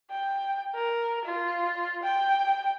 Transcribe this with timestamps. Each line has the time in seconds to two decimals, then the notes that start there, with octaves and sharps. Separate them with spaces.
0.11 G5
0.75 A#4
1.25 F4
2.03 G5